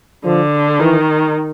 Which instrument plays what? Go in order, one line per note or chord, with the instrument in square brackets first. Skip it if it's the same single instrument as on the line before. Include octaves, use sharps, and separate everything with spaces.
[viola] D3 [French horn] F3
[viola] D#3 [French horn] E3